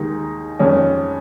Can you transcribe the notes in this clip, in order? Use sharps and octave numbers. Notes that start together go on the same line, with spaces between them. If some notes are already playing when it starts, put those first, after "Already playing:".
Already playing: D#2 D#3 G#3 D#4
F2 D#3 G#3 C#4